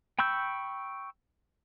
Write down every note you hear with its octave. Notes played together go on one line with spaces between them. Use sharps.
G5 B5 C#6 E6 G6